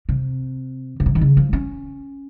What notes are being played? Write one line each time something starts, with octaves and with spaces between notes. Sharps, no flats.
C3
C#3
C3
D#3
C#3
F3
C#4